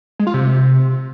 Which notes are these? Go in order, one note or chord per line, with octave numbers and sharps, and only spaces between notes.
G#3
F4
C3